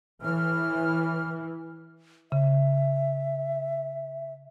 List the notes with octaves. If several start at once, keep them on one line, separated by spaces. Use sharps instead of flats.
A2 E3 F6
C#3 E5